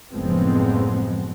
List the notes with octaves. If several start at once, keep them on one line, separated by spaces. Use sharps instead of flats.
F#1 A2 F3 G#3 B3 C4